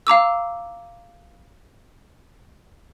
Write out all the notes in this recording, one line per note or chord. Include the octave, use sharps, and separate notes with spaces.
F5 A#5 D6 E6